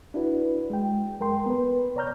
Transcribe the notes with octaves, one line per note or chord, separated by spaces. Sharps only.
D4 E4 F#4 B4
G#3 G5
F#2 G#3 A#4 G5 C6
B3 B4
C2 C#5 D5 A#5 F6 G6